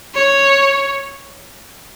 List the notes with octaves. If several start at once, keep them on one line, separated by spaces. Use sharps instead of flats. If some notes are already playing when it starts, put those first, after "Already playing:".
C#5